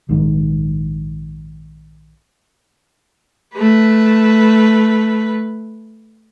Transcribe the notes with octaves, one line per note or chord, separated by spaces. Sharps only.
A#1 G#2 D#3
A3 B4